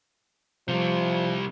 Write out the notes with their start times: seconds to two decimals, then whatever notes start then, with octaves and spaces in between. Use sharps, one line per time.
0.68 C3 F3 G3